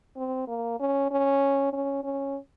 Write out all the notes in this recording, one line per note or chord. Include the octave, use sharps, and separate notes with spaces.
C4
A#3
C#4
C#4
C#4
C#4